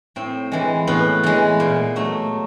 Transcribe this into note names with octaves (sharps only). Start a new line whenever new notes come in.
A2 C4
E3 G#3
A2 B3
E3 G#3
A#2
F#3 A3